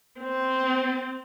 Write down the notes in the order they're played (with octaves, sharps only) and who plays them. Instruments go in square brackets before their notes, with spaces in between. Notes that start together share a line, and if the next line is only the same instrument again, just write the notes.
[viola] C4